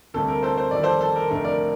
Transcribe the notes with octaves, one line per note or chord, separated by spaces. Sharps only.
D2 C3 G3 A4
A#4
A4 C5
C5
F2 D#3 G3 D5
A4 C5
A4
A#4
F1 F2 D3 A3 A#4
A#4 D5